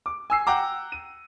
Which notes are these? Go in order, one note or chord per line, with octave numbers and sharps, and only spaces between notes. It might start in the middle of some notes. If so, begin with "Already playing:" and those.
D6
G#5 E6 C7
F#5 G5 A#5 D6
D#7